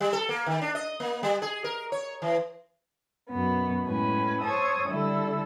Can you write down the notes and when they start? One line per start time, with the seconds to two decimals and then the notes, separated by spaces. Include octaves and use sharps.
0.01 G3
0.13 A4
0.29 A#3
0.46 D#3
0.62 D4
0.75 D#5
1.00 A#3
1.23 G3
1.42 G#4
1.64 A#4
1.92 C#5
2.22 E3
3.31 F#2 B2 B3
3.87 A2 G#3 C#4 B4 G#5
4.42 C5 C#5 A5 C#6 D#6 E6
4.89 D3 G3 E4 A4 E6